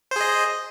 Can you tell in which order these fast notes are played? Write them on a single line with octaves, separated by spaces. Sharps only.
C5 G#4 D#5